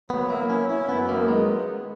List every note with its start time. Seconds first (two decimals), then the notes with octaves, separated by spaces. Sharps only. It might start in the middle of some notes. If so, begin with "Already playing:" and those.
0.10 F#3 B3
0.30 A#3 E4
0.49 C#4 E4
0.69 C#4 E4
0.89 F#2 B3
1.09 D#3 A#3
1.28 G#3 B3